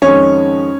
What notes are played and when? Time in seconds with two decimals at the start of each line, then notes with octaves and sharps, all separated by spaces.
0.02 F2 D#3 G#3 C#4 C#5